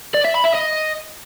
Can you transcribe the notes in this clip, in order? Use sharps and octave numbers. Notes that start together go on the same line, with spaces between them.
D5
E5
B5
E5
D#5